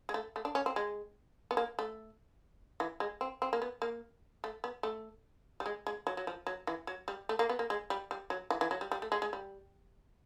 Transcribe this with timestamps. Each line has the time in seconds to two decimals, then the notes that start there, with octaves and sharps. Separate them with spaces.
0.09 G#3
0.14 A3
0.36 A3
0.45 D4
0.55 C#4
0.66 C4
0.76 G#3
1.51 B3
1.57 A#3
1.79 A3
2.80 E3
3.00 G#3
3.21 C4
3.42 C4
3.53 A#3
3.62 B3
3.82 A#3
4.44 A3
4.64 B3
4.83 A3
5.60 G3
5.66 G#3
5.87 G#3
6.07 F#3
6.17 F#3
6.27 F3
6.47 F#3
6.67 E3
6.87 F#3
7.08 G3
7.29 A3
7.39 A#3
7.49 B3
7.59 A#3
7.70 G#3
7.90 G3
8.11 G3
8.30 F#3
8.50 E3
8.61 E3
8.71 F#3
8.81 G3
8.91 G3
9.02 A3
9.12 G#3
9.22 G#3
9.33 G3